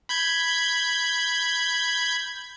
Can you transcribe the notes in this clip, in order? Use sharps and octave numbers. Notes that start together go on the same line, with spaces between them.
B5 G6 G#6